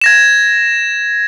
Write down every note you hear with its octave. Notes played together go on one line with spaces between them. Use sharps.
G#6 A#6 E7